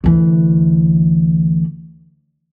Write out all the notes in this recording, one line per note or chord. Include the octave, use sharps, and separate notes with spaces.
D2 E3